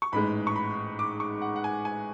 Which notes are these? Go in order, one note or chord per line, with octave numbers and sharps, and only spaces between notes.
C#6
A1 G#2 G#3 B5
C#6
B5
D6
C#6
F#5
F#5
G#5
G#5